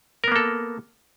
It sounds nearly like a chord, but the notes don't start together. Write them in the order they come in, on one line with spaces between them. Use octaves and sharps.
A#4 B3 A#3 A4